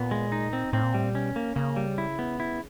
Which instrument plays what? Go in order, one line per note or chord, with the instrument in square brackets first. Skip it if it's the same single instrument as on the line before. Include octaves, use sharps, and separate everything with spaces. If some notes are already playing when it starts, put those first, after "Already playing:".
Already playing: [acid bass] A#2 [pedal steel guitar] B3
[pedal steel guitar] G#3
D#4
C4
[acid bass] A2 [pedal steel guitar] C4
[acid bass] A#2
[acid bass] A2 [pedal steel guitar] G3
[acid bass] A#2
[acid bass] B2 [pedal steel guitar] C#4
[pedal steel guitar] A#3
[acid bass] C#3 [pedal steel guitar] A#3
[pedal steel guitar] G3
E4
B3
E4